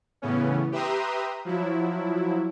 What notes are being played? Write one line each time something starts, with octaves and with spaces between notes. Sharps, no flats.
A2 C#3 E3 B3 C#4
G4 B4 E5 A#5 C6 D#6
F3 F#3 E4